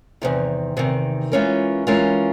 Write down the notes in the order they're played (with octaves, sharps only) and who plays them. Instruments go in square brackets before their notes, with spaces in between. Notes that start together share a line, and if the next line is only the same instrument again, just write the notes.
[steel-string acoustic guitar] E2 C3 D#3
E2 C3 D#3
E3 G#3 C#4 F4 A#4
E3 G#3 C#4 F4 A#4